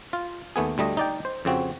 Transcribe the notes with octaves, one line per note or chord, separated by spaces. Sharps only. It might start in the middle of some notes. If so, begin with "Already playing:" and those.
F4
D#2 A3 B3 G#4
D2 G3 A3 D#5
D#4 D5 G5
C5
F2 C#3 C4 F#4